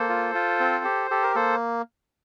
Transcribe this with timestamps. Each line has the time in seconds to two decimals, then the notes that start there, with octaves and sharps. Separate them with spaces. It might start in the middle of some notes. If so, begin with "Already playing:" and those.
Already playing: A#3 A4 C5
0.09 F4
0.35 F4
0.60 C4
0.84 G4
1.11 G4 A4
1.23 A#4
1.35 A#3 A4 C5